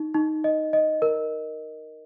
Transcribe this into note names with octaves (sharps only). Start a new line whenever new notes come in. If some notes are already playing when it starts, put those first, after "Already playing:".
Already playing: D#4
D#4
D#5
D#5
A#4